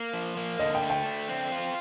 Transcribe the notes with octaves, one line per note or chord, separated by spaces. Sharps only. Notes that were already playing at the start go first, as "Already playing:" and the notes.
Already playing: A#3
F3
A#3
D3 D#5
G5
A3
G5
D3
C4
F4